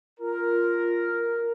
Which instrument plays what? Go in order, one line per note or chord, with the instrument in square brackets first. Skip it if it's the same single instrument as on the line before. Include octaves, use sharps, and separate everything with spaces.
[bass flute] F4 [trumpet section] A#4